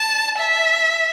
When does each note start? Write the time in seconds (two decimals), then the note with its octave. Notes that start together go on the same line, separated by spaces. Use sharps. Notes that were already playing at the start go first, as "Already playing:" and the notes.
Already playing: A5
0.38 E5